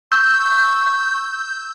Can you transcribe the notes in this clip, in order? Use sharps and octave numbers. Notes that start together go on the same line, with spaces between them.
C#6 E6 G6